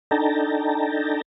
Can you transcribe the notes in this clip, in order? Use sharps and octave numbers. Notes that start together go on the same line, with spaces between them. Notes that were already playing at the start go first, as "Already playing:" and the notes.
D4 D#4 A4 G5 A5 A#5